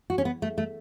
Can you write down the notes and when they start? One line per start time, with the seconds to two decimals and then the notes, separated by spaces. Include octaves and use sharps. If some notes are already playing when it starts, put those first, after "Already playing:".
0.10 F#4
0.18 C#4
0.25 B3
0.42 A3
0.58 A3